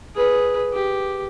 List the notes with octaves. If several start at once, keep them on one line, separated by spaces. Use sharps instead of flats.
G#4 B4
G4